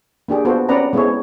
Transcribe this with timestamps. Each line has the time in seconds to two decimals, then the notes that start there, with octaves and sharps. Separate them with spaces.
0.28 A#3 D4 G4 G#4
0.45 B3 F4 F#4 A4 C5
0.69 C4 C#4 B4 D5 F#5 A#5
0.93 G#3 B3 C4 E4 A4 C#5